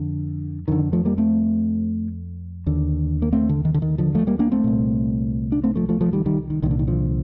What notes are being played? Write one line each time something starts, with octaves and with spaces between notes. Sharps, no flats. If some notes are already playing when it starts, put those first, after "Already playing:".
Already playing: F2 D3
F2 D3 D#3
F3 A3
G3 A#3
A3 C4
D#2 D3
A#3
A3 C4
D3
D#3
D3
D#3
D3 F3
F3 A3
G3 A#3
A#3 D4
A3 C4
C2 A#2
D4
A3 C4
F3 A3
F3 A3
F3 A3
D#3 G3
D#3 G3
D#3
C2 A#2 D#3
D3
D#3
D3 F3